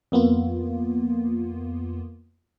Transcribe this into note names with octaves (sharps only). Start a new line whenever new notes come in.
F2 A#3 B3 F4